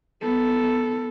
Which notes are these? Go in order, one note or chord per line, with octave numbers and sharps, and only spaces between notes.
B3 A4